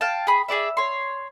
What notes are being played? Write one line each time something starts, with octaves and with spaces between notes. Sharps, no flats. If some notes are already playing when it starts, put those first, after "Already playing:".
F5 G5 A5
G#4 B5
G#4 A#4 D5 E5
C#5 C6